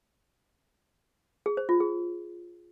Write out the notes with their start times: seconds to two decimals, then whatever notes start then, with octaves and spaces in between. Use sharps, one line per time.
1.46 G#4
1.57 C5
1.69 F4
1.80 G#4